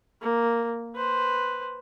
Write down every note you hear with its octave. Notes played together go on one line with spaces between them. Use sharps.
A#3
B4 C5